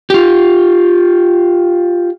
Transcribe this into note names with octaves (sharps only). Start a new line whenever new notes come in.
F4 G4